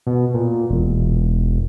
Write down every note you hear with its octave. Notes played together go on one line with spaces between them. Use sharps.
B2
A#2
E1